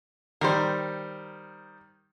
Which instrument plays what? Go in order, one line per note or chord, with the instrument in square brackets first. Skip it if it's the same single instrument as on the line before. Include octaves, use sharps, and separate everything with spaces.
[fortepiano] D#3 G3 [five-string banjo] A#4 C5